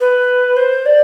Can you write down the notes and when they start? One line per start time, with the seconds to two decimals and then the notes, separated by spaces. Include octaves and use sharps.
0.01 B4
0.57 C5
0.86 D5